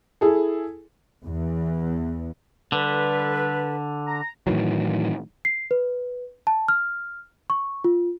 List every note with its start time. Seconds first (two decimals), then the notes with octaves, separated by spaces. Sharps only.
0.21 E4 G#4 A4
1.23 E2
2.72 D3 G3 A4 B4
4.07 A#5
4.47 A2 D#3 E3 F#3
5.45 C7
5.71 B4
6.47 A5
6.68 F6
7.50 C#6
7.84 F4